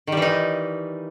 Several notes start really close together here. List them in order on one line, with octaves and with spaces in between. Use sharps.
D#3 G3 E3 D#4